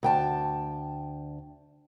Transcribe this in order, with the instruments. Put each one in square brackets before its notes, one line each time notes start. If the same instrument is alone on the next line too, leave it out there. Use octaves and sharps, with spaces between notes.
[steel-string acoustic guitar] D2 G5 A5